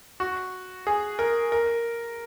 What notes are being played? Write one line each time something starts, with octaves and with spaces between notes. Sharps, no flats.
F#4
G#4
A#4
A#4